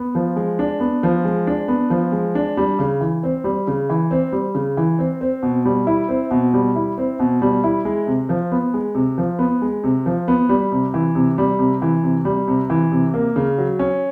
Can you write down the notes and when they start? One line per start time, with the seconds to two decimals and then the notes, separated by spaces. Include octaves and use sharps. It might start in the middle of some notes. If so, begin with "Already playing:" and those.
Already playing: B3
0.15 F3
0.36 G#3
0.59 D4
0.80 B3
1.03 F3
1.25 G#3
1.47 D4
1.68 B3
1.90 F3
2.12 G#3
2.35 D4
2.57 G3
2.79 C#3
3.01 E3
3.23 C4
3.44 G3
3.67 C#3
3.89 E3
4.11 C4
4.33 G3
4.55 C#3
4.77 E3
4.99 C4
5.21 C4
5.43 B2
5.66 G3
5.87 E4
6.09 C4
6.31 B2
6.54 G3
6.76 E4
6.98 C4
7.20 B2
7.42 G3
7.64 E4
7.85 G#3
8.07 C3
8.29 F3
8.52 B3
8.74 G#3
8.95 C3
9.18 F3
9.39 B3
9.62 G#3
9.84 C3
10.06 F3
10.28 B3
10.49 G3
10.72 C3
10.94 E3
11.15 C3
11.38 G3
11.59 C3
11.82 E3
12.03 C3
12.25 G3
12.48 C3
12.70 E3
12.92 C3
13.14 A#3
13.36 C#3
13.58 F#3
13.79 C#4